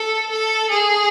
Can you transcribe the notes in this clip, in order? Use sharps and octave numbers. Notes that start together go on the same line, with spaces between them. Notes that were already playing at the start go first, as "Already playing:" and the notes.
Already playing: A4
A4
G#4